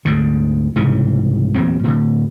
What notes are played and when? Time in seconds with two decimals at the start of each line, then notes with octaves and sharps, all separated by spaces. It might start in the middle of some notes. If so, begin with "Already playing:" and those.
0.05 D2 G#2 D3
0.76 C2 G#2 C#3 E3
1.55 E2 A#2 F#3 C4
1.83 A2 D3